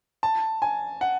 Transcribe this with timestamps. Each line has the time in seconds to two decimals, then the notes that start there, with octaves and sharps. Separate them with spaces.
0.23 A5
0.62 G#5
1.01 F#5